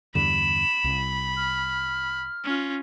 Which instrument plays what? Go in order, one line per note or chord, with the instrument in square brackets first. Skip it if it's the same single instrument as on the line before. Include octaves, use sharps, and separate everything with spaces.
[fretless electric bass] E2 G2 D3 [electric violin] B5 [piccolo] E7
[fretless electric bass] C2
[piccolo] F6
[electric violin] C#4 F4